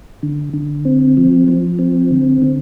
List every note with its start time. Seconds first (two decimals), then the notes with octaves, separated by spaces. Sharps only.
0.23 D3
0.54 D3
0.85 C4
1.17 F3
1.48 F3
1.79 C4
2.11 D3
2.42 D3